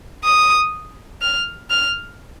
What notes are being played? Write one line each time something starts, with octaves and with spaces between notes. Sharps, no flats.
D#6
F6
F6